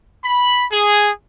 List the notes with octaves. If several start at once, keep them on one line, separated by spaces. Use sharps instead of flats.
B5
G#4